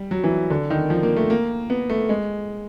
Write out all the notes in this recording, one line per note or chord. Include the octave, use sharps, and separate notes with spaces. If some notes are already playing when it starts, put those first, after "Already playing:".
Already playing: G3
F#3
E3
D3
D#3
F3
A#3
A3
A#3
B3
A3
G#3